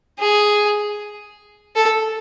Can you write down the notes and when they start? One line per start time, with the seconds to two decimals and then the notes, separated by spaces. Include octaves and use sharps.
0.19 G#4
1.76 A4